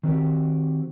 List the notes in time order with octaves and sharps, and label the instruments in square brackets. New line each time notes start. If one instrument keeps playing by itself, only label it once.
[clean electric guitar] D#3 C4 F#4 G4